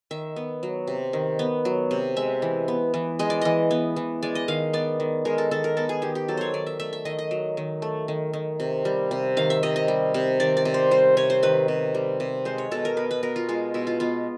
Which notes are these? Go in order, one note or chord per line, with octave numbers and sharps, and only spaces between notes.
D#3 E5
B3
F#3
C3
D#3
B3
F#3
C3
G#3 E5
E3
B3
E3
G#3 D#5
D5
E3 D#5
B3
E3
G#3 D5
D#5
D#3 F5
B3 D5
D#3
G#3 A#4
A4
D#3 A4
A#4
B3 A4
G#4
D#3 G4
G4
F#3 A4
C5 C#5
D#3 D5
E5
A3 E5
E5
D#3 D#5
D#5
F#3
D#3
A3
D#3
D#3
C3
G3
C3
D#3 F5
E5
C3 D#5
D#5
G3
C3
D#3 D5
D5
C3
C5
G3 C5
C3 C#5
C5
D#3 B4
C3
G3
C3
G#3 C5
C#5
B2 A4
A#4
B3 B4
B4
B2 A#4
F4
G#3 F4
B2 E4
F4
B3 F4